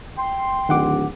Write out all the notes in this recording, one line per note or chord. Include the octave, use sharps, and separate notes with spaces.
G5 C6
D1 D#3 F#5 D6